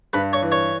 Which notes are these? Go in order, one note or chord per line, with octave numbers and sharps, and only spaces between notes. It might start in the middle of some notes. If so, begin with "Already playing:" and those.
G2 B4
C#5
E3
C#5